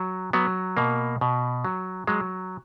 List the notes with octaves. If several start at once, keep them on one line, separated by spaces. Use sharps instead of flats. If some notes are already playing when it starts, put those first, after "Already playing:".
Already playing: F#3
F#3 B3
B2 A#3
B2
F#3
F#3 G#3